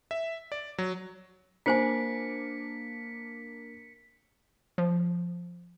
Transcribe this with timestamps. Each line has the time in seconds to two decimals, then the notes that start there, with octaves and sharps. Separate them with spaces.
0.11 E5
0.52 D5
0.78 F#3
1.66 A#3 D4 F4 C5 G#5 B6 C#7
4.78 F3